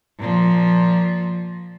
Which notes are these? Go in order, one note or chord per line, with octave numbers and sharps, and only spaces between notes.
A#2 F3